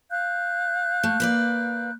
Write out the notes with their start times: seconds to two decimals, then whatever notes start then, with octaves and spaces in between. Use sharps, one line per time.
0.11 F5 F#6 G6
1.03 A3
1.20 A#3 B4 D5